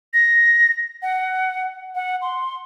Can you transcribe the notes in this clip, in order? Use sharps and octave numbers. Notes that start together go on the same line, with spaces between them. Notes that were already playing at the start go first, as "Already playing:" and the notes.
A#6
F#5
F#5
C6